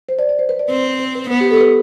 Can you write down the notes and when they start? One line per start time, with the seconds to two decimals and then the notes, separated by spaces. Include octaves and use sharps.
0.09 C5
0.19 D5
0.29 D5
0.39 C5
0.49 B4
0.59 D5
0.69 C4 C5
0.84 C5
1.00 C5
1.15 B4
1.30 B3 B4
1.41 G4
1.51 A4
1.61 B4